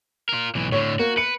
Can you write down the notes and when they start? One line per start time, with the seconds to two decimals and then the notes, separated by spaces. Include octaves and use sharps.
0.29 F4 A#4
0.55 B1 E3
0.72 A2 D3 C#5
0.99 A#3 F#4
1.17 B4 C#7